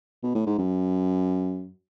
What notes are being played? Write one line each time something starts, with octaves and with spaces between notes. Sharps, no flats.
B2
A2
G#2
F#2